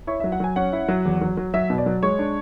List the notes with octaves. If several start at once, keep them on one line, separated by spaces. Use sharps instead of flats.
E4 C#5
E5
F#3
F#5
F#3 G#5
C#4 F#5
E4
F#3
E2
F#3
F#3
F#3 E5
B2
D5
F#3
G#3 C#5
D4